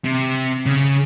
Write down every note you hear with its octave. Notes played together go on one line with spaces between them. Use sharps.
C3
C#3